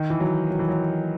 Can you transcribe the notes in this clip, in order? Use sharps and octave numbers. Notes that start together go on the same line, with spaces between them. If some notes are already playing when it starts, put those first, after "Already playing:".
Already playing: D#3
E3
F#3
F#3
E3
F#3